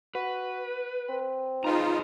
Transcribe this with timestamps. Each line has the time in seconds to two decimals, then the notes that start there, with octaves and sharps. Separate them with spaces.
0.15 F#4 B4
1.09 C4
1.64 D#4 F4 G#4 B4 A#5